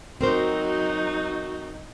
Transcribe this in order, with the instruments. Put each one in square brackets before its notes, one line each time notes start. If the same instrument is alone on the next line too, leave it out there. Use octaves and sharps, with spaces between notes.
[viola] F#3 D#4 [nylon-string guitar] C4 A#4 C5 [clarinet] F#4